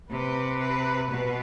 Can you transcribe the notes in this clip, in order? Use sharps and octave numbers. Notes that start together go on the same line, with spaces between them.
C3 B4
B4
B2 B4